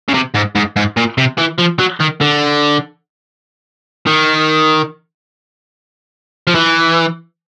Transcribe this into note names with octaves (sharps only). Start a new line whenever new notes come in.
C#3
C3
G#2
G#2
G#2
A#2
C3
E3
F3
F#3
D#3
D3
D#3
F3
E3